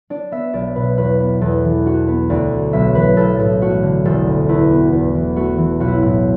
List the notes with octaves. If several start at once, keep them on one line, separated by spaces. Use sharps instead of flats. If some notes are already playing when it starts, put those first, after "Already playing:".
D4 D5
B3 E5
B1 D5
B2 B4
E2 B4
B3
E2 A4
E3
D4 F#4
B3
D2 D5
D3
B1 E5
E3 B4
B1 A4
A2 A4
A3 F#4
D3
E1 A4
D2
E2 E4
B3
E2
E3
A3 F#4
E3
B1 F#4
E4
A2 E4